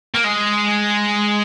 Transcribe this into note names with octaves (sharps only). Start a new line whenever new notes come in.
A#3
G#3